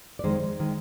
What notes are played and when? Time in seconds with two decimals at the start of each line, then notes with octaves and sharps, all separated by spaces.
0.19 D5
0.24 F2 D#3 G#3 C5
0.60 D#3 G#3